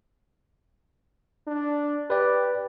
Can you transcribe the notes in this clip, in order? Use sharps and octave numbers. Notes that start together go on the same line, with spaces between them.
D4
G4 B4 D5